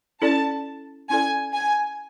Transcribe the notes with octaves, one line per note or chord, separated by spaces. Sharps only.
C#4 E4 A4 D5 A5
C#4 E4 A4 D5 G#5
G#5